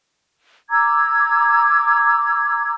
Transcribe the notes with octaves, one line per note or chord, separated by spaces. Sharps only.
A#5 D6 E6 G#6